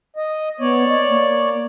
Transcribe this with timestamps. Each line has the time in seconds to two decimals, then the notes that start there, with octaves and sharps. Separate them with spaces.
0.16 D#5
0.60 B3 C#5 D5
0.88 D#5
1.09 A#3